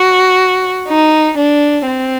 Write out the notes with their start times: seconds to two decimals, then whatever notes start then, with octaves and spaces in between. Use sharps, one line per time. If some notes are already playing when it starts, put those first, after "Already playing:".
Already playing: F#4
0.88 D#4
1.38 D4
1.87 C4